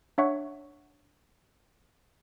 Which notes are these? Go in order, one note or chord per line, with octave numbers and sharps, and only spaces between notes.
D4 C#5 E5 F#5 C#6